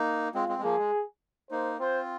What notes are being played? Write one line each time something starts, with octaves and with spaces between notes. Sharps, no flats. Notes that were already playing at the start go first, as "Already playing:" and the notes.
Already playing: A#3 D#4
G#3 C4 F4
G#3 C4
G#3
F3 A#3 G#4
G#3
A#3 D#4 C5
C4 F4 C5